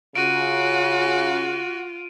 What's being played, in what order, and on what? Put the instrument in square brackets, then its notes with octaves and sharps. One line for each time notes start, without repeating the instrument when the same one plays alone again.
[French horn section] C#3 [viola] F4 [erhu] F#4 [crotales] D7 D#7